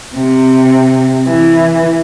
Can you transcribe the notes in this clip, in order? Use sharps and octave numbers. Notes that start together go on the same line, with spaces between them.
C3
E3